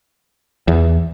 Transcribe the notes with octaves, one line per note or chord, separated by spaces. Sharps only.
E2